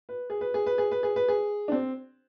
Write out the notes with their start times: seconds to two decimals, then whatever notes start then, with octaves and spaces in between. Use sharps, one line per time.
0.09 B4
0.30 G#4
0.41 B4
0.54 G#4
0.66 B4
0.78 G#4
0.91 B4
1.03 G#4
1.16 B4
1.28 G#4
1.68 D4
1.72 C4